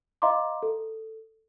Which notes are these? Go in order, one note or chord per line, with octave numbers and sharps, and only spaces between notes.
D#5 F5 A#5 C6 D6
A4